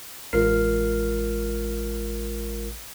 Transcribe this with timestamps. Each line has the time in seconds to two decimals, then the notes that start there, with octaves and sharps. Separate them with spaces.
0.33 A1 G#3 F4 A#4 F6 C7